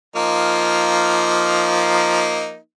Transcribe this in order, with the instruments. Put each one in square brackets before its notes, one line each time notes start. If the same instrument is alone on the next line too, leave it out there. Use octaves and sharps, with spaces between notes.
[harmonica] F3 A#3 D#4